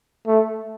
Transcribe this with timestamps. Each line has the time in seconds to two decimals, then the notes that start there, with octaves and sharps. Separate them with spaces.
0.27 A3